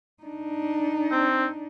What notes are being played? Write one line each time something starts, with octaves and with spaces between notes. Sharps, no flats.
D4 D#4
C4